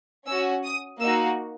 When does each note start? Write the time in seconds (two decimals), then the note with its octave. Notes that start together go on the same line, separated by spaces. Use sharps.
0.27 C#4 F#4 E6
0.64 D#6
1.01 A#3 D#4 F#4 E6